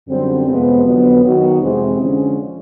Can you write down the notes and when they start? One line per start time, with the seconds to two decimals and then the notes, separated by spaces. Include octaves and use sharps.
0.08 F#2 D3 G3 C4
0.47 F2 C3 F3 G#3 B3
0.85 F2 D3 F#3 B3
1.23 D#3 F#3 B3 D#4 F#4
1.61 F2 C3 E3 G#3 C4
1.98 D3 F3 G#3 C#4